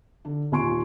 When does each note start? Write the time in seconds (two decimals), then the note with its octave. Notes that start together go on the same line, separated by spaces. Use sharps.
0.25 D3 D4
0.52 D#2 A#2 G#5 C6 C#6 D7